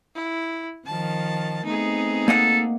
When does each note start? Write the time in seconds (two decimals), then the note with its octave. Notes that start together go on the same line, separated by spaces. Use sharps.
0.15 E4
0.87 D#3 F3 A5
1.66 A3 B3 C4 D#4 G#4
2.28 A#3 A4 D#5 F#5